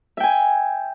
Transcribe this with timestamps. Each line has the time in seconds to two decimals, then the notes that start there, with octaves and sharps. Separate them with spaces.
0.17 E5
0.20 G5
0.23 G#5